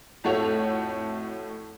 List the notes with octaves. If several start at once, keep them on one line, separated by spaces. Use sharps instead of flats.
F2 A2 A3 F#4 C#5 F7